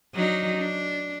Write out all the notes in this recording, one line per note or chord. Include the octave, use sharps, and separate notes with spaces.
F#3 D4 D#4
D4